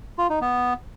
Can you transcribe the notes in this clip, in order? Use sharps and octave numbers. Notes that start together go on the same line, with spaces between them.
F4
D#4
B3